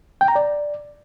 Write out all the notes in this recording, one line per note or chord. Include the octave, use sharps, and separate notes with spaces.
G5
A#5
D5